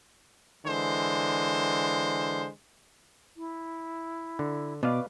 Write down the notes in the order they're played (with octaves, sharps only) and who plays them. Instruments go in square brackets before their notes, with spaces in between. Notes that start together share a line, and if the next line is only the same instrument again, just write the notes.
[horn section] D3 E3 G#3 C5
[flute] E4
[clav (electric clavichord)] D3
[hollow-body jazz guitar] B2 [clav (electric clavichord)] B4 D5 F5 [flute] D6